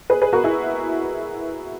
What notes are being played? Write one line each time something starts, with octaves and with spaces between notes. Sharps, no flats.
G#4 B4
G#4 B4
F#4 A#4
E4 G#4